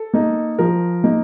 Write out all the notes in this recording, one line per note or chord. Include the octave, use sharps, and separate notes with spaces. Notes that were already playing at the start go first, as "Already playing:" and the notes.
Already playing: A4
A#3 D#4
F3 A#4
A#3 D#4